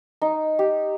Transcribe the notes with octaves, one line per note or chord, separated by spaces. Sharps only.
D#4
G4